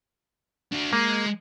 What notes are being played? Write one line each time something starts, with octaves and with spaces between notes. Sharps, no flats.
D4 F#4
G#3 A#3